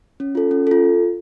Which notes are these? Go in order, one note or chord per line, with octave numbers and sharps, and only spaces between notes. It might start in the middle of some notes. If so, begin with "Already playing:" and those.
C#4
F4 A4
C#4
F4 A4